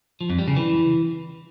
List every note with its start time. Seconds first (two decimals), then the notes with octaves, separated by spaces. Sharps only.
0.21 F3
0.30 F2
0.39 G3
0.48 C#3
0.57 E3